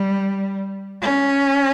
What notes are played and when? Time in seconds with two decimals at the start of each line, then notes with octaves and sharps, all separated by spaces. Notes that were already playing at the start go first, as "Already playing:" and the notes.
Already playing: G3
1.02 C#4